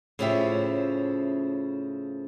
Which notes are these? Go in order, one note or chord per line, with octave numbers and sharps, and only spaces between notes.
A2 C#3 F3 C#4 G4 E5